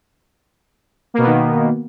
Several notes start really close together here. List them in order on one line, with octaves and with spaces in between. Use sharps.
A#3 B2 B3 D#3